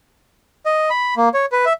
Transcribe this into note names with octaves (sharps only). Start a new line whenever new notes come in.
D#5
B5
A#3
C#5
B4
E5